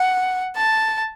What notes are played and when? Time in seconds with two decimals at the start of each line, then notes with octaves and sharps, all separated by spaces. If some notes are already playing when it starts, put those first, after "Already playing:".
Already playing: F#5
0.56 A5